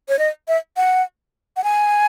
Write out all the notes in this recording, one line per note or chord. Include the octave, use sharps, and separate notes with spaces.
C#5
D#5
E5
F#5
F#5
G#5